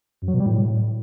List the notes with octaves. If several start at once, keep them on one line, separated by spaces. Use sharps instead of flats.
F#2
F#3
B2
G3
A2